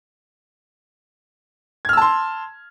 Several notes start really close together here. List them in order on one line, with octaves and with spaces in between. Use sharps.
G#6 F6 E6 A5 C6